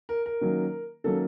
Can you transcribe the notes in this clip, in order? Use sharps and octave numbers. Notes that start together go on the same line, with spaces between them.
A#4
A#4
D#3 F#3 A#3 C#4
D#3 F#3 A#3 C#4 A4